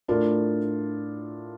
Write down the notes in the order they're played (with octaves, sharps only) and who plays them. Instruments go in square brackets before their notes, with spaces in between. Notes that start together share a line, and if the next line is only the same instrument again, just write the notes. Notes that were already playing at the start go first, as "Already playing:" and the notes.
[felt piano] A2 A3 D4 F4 A#4